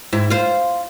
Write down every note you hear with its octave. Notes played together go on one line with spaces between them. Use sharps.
G#2 E4
F4 C5